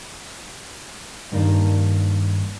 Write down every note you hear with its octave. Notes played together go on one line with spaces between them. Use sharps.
G2 D#3 A#3 D4